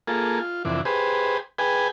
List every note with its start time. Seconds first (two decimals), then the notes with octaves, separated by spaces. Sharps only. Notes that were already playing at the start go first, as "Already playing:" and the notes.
0.07 A#3 F4 G#4 A4
0.39 F4
0.65 F2 C3 E3 D4
0.85 G4 G#4 B4 C5
1.59 G#4 B4 G5 G#5